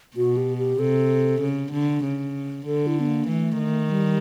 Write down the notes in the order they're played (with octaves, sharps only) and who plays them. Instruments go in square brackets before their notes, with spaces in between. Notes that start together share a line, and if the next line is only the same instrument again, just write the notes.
[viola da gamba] B2 [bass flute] F#4
[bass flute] G4
G4
[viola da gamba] C3 [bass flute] A4
[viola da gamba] C#3
D3
C#3
[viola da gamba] D3 [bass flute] A4
[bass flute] E4
B3
A#3
[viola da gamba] E3 [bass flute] A3
[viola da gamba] D#3
[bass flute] G3